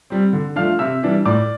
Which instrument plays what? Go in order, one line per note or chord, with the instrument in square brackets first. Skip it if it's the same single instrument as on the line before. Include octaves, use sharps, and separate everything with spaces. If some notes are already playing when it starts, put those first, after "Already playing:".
[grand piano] G3 C4
D3
F3 A3 D4 F5 F6
C3 E5 E6
E3 G3 D4
A2 D5 D6